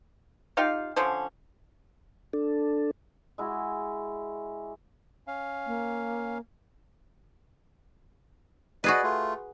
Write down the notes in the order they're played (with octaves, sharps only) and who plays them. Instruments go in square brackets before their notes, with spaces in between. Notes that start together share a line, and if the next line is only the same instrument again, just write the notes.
[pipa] D#4 F4 G4 F5
D3 F3 C#4 C5
[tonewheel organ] D4 A4
[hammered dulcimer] G#3 E4 F#4
[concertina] C#4 F5
[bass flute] A#3
[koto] F#4 G#4 B4 [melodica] D5 D#5
[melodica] A3 F4